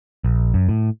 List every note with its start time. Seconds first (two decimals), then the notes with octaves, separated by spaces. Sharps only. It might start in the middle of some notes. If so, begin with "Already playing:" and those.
0.24 A#1
0.54 F#2
0.69 A2